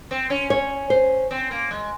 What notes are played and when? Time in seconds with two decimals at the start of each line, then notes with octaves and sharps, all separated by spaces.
0.11 C4
0.30 C#4
0.50 C#4 C#5
0.90 C5
1.31 C4
1.51 A#3
1.71 G#3